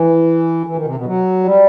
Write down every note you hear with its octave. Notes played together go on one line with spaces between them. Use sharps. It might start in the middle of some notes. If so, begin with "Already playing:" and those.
Already playing: E3
E3
D#3
C3
B2
F#3
G3